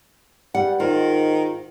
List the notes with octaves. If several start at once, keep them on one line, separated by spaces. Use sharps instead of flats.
G3 F#5
G#2 D#3 F4